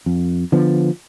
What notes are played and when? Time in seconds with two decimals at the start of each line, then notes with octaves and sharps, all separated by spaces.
0.06 F2
0.52 D3 F3 B3